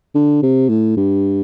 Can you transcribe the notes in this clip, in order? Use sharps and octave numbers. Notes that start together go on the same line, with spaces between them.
D3
C3
A2
G2